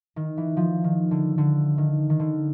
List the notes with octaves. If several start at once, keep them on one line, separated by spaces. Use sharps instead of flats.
D#3
E3
F3
D#3
D3
D3
D#3
D#3
D3